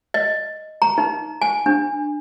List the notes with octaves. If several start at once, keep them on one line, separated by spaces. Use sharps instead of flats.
D#5
A#5
D#4
G#5
D4